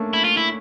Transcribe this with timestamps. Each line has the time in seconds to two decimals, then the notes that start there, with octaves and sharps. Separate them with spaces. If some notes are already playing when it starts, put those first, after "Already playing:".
Already playing: A3 A#3 C#4 D4
0.13 E4
0.24 F4
0.37 E4